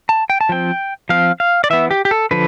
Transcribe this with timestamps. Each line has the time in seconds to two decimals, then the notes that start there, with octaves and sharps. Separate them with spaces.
0.09 A5
0.30 G5
0.41 A5
0.49 F3 C4 G5
1.09 F3 C4 F5
1.40 F5
1.64 D5
1.70 E3 B3 E5
1.91 G4
2.05 G4
2.11 A4
2.31 D3 F3 B4